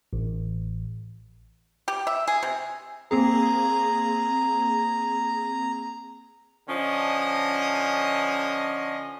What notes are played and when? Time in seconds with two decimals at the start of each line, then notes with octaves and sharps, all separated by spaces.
0.13 A1
1.88 G4
2.07 E5
2.27 G#4
2.43 C3
3.11 A#3 C4 G#4 A#5
6.69 D3 F3 C#4 D#5